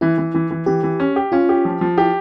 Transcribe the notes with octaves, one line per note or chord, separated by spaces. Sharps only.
E3 E4
E3
E3
E3
E3 G4
E3
C#4
G4
C#4 F4
G4
F3
F3
E4 G4